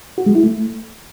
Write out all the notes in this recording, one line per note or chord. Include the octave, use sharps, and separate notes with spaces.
F#4
G#3
E4
A3